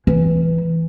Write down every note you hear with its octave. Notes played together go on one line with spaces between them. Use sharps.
E3